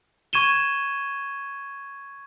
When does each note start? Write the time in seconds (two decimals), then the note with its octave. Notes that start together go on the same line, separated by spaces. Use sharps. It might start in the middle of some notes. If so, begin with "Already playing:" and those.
0.33 C#6 G#6 D#7 E7 G7